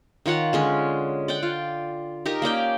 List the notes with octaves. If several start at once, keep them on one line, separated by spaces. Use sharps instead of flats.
D#3 F4 C#5 F#5
D3 G#3 C#4
D5 F#5 G5
F4
D#4 G4 A#4
A#3 C#4 D5 G5